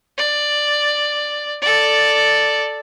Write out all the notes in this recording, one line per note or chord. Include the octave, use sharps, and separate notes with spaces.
D5
A4 D5